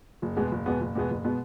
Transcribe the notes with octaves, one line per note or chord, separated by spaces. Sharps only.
F#1
E2 B2 G#3 B3
F#1
E2 B2 G#3 B3
F#1
E2 B2 G#3 B3
F#1
B2 G#3 B3